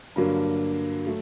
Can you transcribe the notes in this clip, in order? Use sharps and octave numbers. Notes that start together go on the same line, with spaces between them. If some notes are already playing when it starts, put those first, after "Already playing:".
G2 D3 F#3 A#3
F#3 A3